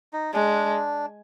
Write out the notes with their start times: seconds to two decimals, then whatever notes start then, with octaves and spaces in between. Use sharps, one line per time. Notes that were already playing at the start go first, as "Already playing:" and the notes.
0.13 D#4
0.33 G#3 D4